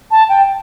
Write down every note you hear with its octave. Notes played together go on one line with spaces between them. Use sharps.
A5
G5